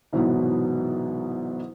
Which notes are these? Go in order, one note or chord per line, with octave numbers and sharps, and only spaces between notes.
C2 G#2 B2 E3 F#3 B3